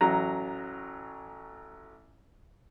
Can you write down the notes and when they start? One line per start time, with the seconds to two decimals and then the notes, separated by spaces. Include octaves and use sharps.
0.01 A1 F#3 A#5